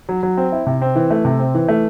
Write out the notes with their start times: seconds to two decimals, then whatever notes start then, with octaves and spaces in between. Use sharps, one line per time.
0.09 F#3
0.23 F#3
0.37 C4
0.52 E4
0.67 C3
0.82 C4
0.96 E3
1.10 A3
1.25 C3
1.39 C4
1.55 E3
1.68 A3